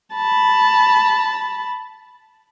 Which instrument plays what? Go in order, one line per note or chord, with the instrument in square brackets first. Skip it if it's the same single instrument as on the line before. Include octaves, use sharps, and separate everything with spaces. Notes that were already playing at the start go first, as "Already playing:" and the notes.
[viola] A5 B5